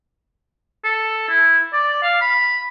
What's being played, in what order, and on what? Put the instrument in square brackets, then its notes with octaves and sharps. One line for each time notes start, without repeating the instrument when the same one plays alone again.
[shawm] A4
E4
D5
F5
B5